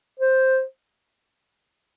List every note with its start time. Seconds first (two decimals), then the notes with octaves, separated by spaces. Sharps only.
0.20 C5